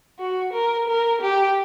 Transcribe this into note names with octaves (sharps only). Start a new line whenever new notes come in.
F#4
A#4
A#4
G4